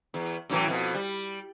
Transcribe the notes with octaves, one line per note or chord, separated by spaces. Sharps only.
E2
F#2 A2 E3
F2 B2
G3